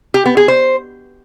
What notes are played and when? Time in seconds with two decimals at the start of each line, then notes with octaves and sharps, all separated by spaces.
0.14 G4
0.26 B3
0.37 G#4
0.48 C5